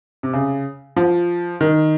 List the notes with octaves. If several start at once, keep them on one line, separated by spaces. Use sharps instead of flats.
C3
C#3
F3
D#3